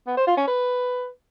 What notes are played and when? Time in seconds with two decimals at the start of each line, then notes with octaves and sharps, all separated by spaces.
0.07 B3
0.17 C5
0.27 F4
0.37 C#4
0.47 B4